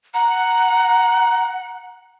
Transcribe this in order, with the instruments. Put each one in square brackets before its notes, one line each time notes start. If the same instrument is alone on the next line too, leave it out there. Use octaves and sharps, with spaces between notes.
[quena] F#5 [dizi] A#5